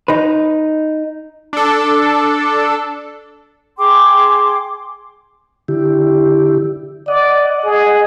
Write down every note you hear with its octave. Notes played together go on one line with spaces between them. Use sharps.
D#4 B4
D4 A4
G#4 G5 C6 D6
D3 E4 G4
D5 D#5 F#5
G#4